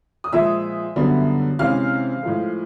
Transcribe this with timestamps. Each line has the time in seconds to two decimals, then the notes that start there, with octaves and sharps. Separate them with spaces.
0.24 D#6
0.32 A#2 F3 G#3 E5 E6
0.96 F#2 D3 G3 B3
1.59 C3 E3 G#3 C#4 F5 F6
2.23 A2 F3 G#3